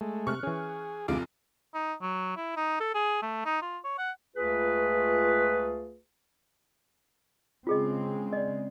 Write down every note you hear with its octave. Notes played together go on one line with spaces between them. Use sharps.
G#3 A3
C3 C#6 F6 F#6
E3 C#4 G#4
F1 D2 C3 G#3 F4 D6
D#4
F#3
E4
D#4
A4
G#4
A3
D#4
F4
C#5
F#5
C#2 A3 F4 G#4 B4
C#3 G#3 C4 F4 G#4 D#5
D5 D#5